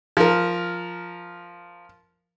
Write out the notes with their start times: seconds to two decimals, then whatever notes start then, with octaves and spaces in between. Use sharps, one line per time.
0.17 F3 A#4